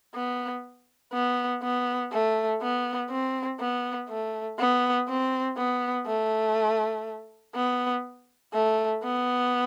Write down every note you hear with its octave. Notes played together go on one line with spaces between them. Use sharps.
B3
B3
B3
A3
B3
C4
B3
A3
B3
C4
B3
A3
B3
A3
B3